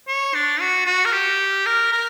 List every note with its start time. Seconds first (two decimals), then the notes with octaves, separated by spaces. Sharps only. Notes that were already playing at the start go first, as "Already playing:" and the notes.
0.08 C#5
0.34 D4
0.61 F#4
0.86 F#4
1.05 A#4
1.12 G4
1.66 A#4
1.92 A#4